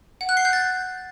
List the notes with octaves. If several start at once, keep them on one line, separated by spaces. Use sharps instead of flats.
F#5
F#6
C7
G6
A6